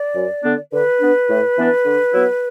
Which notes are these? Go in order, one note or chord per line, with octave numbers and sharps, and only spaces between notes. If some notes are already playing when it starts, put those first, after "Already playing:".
Already playing: D5
F#2
D3 B3 D4
D3 B4
B3 D4
A2
E3 B3 D4
D3
F#3 B3 E4